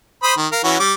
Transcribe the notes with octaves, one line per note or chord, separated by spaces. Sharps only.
C5 B5 D#6
D#3
A#4 F5
E3 C#4 F#4
G3 D6